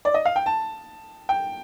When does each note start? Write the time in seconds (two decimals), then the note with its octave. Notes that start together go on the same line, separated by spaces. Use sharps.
0.05 D5
0.14 D#5
0.25 F5
0.36 G5
0.46 A5
1.29 G5